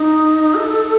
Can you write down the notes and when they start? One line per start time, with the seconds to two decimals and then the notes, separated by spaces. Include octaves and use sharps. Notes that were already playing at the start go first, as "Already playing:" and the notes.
Already playing: D#4
0.55 A4